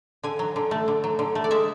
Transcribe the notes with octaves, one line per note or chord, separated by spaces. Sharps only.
D3 G#5
F#3
D3
A3
D3
F#3
D3
A3
D5
G#3 E5